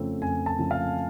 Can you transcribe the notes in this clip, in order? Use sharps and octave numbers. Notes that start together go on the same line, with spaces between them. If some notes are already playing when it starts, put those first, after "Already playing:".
Already playing: F2 C#3 F3 A3 C4
F2 G#5
A5
C#3 F3 A3 C4
F5